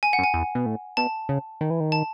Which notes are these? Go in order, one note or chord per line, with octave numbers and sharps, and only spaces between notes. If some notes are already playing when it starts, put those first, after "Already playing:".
G#5
F#5
F#2
G#5
E2
B2
A2
B2 A5
C#3
D#3
E3
D#3
A5